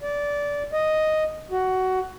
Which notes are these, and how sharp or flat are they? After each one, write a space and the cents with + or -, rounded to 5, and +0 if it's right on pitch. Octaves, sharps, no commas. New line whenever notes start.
D5 -15
D#5 +0
F#4 +15